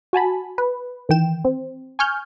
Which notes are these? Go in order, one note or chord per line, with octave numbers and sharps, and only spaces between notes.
F#4 G#5 A5 B5
B4
D#3 E3 G5 E7
C4
G#5 C#6 F6 G6